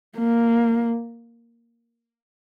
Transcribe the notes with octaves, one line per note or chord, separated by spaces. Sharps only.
A#3